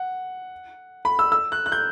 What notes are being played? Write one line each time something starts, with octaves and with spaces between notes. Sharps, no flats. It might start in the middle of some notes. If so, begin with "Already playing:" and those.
Already playing: F#5
B5
E6
E6
F#6
F#6
G6